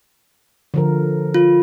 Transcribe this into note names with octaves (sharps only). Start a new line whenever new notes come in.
D3 F3 A#4
F4